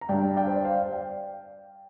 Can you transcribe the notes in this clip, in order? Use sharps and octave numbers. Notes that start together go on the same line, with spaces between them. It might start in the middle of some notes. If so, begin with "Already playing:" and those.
A#5
G2 G3 D4 D5 G5
D5 G5
C5
D5
C5 F5
F5
D5 G5